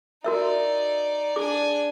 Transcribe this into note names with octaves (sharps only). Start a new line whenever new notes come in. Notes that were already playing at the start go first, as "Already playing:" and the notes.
D#4 F#4 A#4 D5 E5
D4 G#4 G#5 D6